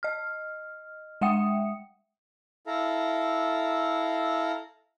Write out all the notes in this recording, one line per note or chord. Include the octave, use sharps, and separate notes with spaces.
D#5 F6
G#3 E5 F#5 G5 D#6 C#7
E4 A4 F5 A#5